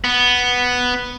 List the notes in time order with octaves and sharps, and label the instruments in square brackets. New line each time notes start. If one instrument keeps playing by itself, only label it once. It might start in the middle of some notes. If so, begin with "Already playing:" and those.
[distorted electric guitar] B3